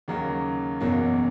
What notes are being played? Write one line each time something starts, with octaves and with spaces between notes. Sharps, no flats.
D#2 C#3 F#3 A#3
F#1 E2 B2 F#3 A#3